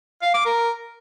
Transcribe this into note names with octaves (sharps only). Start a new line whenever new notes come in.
F5
D6
A#4